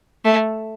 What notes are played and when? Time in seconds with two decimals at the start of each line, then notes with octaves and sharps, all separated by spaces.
0.25 A3